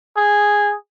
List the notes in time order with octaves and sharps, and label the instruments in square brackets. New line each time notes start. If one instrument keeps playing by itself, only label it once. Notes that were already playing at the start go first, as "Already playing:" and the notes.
[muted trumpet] G#4